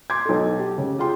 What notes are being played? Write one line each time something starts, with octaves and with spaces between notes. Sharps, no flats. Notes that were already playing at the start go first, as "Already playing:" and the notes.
C6 D6 G#6
B1 A4
G4
C#3
F4 G#4 G5 C6